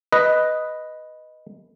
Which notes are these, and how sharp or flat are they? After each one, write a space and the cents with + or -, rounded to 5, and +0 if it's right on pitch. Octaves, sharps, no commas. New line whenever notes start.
B4 +0 D#5 +0